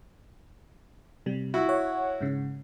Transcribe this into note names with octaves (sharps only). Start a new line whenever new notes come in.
C3 G3
E4 F#4
C#5 F#5
G#2 C#3